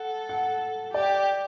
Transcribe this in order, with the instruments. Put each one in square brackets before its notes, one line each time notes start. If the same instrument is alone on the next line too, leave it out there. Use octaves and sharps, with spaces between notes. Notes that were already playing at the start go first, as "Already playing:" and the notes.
Already playing: [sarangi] A4 [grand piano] F#5
[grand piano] F#5
[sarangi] G4 [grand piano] D5